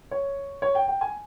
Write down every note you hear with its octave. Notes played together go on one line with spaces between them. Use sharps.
C#5
C#5
G5
G5
G#5